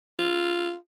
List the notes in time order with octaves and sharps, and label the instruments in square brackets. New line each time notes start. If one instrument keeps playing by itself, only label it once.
[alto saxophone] F4